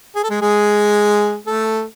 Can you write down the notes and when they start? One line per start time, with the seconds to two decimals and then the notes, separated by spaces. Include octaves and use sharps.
0.16 G#4
0.23 A4
0.30 G#3 G#4
0.41 G#3 G#4
1.47 A3 A4